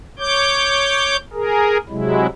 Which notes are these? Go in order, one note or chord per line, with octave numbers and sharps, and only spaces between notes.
C#5 D6 G6
G#4 A#4
C3 F#3 G#3 E4